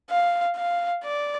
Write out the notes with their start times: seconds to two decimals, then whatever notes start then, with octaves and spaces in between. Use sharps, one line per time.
0.10 F5
0.56 F5
1.04 D5